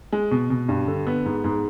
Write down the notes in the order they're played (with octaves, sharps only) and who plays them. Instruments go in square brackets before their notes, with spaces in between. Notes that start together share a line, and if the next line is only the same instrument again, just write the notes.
[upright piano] G#3
B2
B2
G2
D3
B3
G#2
G#2